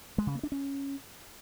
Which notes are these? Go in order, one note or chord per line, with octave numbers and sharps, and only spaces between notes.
G#3
C#3
A#3
D4
C#4